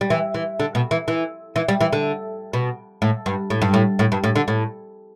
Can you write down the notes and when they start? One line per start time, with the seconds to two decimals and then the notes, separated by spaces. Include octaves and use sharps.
0.01 G3
0.10 E3
0.34 E3
0.60 D3
0.75 B2
0.91 E3
1.08 E3
1.56 E3
1.69 G3
1.81 E3
1.93 D3
2.53 B2
3.02 A2
3.26 G2
3.50 A2
3.62 G2
3.74 A2
3.99 A2
4.12 G2
4.24 A2
4.35 D3
4.48 A2